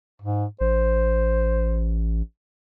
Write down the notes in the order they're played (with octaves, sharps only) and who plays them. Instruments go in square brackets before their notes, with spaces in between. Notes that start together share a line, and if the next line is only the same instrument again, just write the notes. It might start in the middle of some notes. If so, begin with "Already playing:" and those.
[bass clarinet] G#2
[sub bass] A1 [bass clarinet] C5